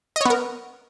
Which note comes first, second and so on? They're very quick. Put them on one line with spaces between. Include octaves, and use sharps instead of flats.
D#5 C#5 B3 A#4